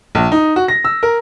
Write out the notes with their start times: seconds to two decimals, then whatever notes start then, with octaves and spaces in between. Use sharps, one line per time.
0.15 A#1
0.32 D#4
0.56 F#4
0.68 A#6
0.85 E6
1.03 A#4